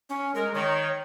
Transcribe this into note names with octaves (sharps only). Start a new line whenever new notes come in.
C#4
G#3 A#4
D#3 C#5